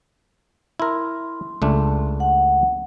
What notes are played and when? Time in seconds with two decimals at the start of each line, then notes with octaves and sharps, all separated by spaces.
0.80 E4 A#4 C6
1.62 C#2 A3 D4
2.20 F#5